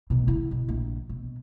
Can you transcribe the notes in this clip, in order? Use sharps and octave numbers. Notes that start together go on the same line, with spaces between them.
B1 B2
C#3 E4
B2
A#1
B2